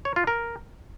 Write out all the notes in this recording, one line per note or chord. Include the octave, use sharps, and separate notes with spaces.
C#5
F4
A#4